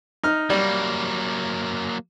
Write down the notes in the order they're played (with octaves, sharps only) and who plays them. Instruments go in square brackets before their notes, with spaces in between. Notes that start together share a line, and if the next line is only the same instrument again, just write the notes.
[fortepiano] D#4 F6
[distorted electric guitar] F#3 A#3 [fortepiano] G3